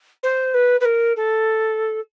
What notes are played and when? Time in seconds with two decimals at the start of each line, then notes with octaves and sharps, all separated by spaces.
0.23 C5
0.54 B4
0.81 B4
0.85 A#4
1.16 A4